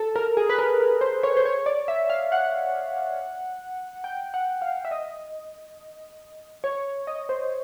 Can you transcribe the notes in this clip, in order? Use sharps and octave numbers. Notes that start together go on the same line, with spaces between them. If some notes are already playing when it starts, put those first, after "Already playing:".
Already playing: A4
A#4
G#4
B4
A#4
A#4
C5
C#5
C5
C#5
D5
E5
F5
F#5
G5
F#5
F5
E5
D#5
C#5
D#5
C5